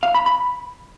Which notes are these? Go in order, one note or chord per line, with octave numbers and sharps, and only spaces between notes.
F5
B5
B5